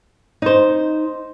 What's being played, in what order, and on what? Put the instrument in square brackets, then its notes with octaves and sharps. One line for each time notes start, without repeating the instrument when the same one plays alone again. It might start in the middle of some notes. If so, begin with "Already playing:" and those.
[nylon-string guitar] D#4 C5